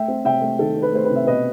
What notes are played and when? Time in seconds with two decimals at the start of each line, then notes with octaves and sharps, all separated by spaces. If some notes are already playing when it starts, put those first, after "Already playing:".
Already playing: A3 E5 G5
0.08 C4
0.24 C3 E5 G5
0.41 A3
0.59 D#3 A4
0.76 C4
0.82 B4
0.92 A3 C5
1.05 C3 B4
1.16 E5
1.27 B2 B4 D#5